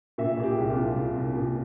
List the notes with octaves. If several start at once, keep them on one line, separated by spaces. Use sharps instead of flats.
A#2 E5
A#2 G#4
G4
C2
F4
C2
C2
C2
A#2